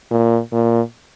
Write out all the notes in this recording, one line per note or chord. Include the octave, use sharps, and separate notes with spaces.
A#2
A#2